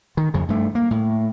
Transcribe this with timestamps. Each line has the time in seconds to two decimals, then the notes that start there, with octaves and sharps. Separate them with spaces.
0.17 D#3
0.34 F2 C#3
0.48 G2 A3
0.75 A#3
0.91 A2